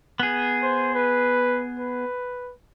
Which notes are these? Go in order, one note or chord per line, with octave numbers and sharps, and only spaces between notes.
B3 G#4
C5
B4
B4